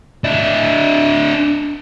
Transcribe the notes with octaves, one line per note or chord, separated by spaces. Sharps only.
D4 E4